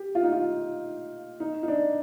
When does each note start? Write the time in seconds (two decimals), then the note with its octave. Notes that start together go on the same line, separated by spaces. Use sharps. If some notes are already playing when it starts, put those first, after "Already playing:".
Already playing: G4
0.15 F4
0.23 D#4
0.32 F4
1.40 D#4
1.63 D#4
1.68 D4